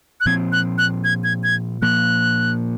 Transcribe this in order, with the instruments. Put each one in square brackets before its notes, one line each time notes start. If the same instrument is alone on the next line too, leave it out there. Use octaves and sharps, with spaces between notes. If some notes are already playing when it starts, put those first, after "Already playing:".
[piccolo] F#6
[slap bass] A#2 F3 C4 [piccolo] G#6
[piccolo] F#6
F#6
G#6
G#6
G#6
[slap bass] A#2 F3 A#3 [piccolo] F#6